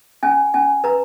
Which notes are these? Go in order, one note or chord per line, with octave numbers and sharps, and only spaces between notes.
C#4 G#5
C#4 G#5
B4 A#5